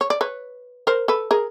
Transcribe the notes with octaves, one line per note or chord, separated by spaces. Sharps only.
C#5
D5
B4 C#5
A#4 C5
A4 B4
G#4 A#4